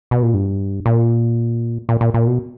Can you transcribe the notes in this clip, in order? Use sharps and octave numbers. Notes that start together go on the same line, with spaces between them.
B2
A#2
G2
A#2
A#2
A#2
A#2
B2